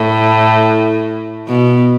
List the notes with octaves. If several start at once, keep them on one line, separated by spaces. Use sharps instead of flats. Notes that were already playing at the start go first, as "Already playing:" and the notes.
Already playing: A2
B2